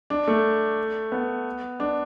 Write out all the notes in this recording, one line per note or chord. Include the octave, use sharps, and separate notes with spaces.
D4
A3
B3
D4